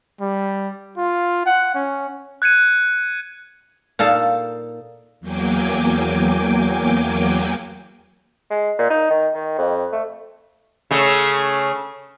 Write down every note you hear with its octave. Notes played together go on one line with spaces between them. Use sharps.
G3
F4
F#5
C#4
F#6 G#6 C#7 D#7
A#2 D#4 A4 F5 A5
E2 F#3 A#3 G5 G#5 D6
G#3
A#2
D#4
D#3
D#3
F2
A3
C#3 A3